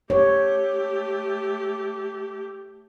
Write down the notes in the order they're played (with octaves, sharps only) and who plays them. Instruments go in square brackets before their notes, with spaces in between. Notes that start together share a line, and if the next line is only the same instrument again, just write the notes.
[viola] A3 G4 [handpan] C#5